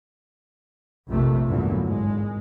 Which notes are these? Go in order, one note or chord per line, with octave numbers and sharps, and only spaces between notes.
A#1 F2 C3 A3
E2 G2 A#2 D3 E3 F#3
G#1 G#3